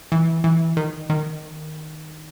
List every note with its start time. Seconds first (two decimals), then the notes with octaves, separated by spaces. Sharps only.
0.12 E3
0.44 E3
0.77 D#3
1.10 D#3